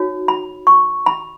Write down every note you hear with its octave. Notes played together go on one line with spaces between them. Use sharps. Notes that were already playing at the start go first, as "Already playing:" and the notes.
Already playing: D#4 F#4 C#5
B5
C#6
B5